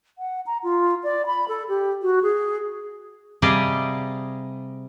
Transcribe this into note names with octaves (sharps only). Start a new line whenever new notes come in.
F#5
A#5
F4
D5
B5
A4
G4
F#4
G#4
C3 G3 G#4 D5 D#5 F5